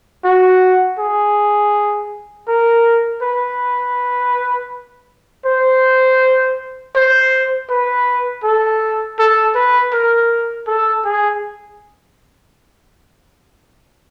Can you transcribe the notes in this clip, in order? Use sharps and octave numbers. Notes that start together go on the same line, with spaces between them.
F#4
G#4
A#4
B4
C5
C5
B4
A4
A4
B4
A#4
A4
G#4